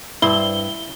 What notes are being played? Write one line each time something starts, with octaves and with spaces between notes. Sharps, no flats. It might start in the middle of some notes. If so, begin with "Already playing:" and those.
G2 E4 C5 G7